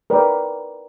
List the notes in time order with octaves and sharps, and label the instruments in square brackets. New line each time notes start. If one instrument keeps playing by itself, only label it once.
[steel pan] A#4 B4 D5 G5